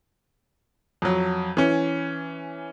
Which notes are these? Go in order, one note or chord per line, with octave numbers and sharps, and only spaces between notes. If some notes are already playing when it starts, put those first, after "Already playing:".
F2 F#3
E3 C#4